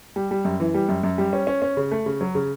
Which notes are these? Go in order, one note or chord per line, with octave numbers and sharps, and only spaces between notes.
G3
G3
F#2
E3
G3
F#2
F#2
G3
C#4
C#4
C#4
C#3
A3
C#3
F#3
C#3